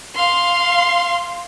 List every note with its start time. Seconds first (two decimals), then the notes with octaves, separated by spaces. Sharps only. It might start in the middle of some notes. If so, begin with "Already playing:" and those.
0.16 F5 C6